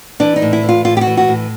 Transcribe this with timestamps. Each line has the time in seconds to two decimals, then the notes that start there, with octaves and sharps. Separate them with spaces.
0.20 E3 D4
0.36 D#4
0.42 A2
0.53 E4
0.63 E3
0.69 F4
0.85 A2 F4
0.97 G4
1.01 F#4
1.07 E3
1.17 F#4
1.28 A2